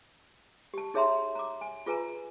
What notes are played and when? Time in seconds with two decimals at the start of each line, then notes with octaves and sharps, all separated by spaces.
0.74 G4 A5
0.94 D#4 G#4 C#5 E5 A#5 C6
1.35 A#5 D6
1.61 G#5
1.86 F4 G#4 B4 G#5 A#5